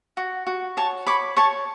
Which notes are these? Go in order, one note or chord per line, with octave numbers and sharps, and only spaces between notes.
F#4
F#4
C#5 A5 C#6
C#5 B5 D6
C#5 A5 C#6